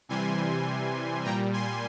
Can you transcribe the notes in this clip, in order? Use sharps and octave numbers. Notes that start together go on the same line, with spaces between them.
C3 E3 G3 G#5 C6
A#2 G3 G5 A#5
G#5 C6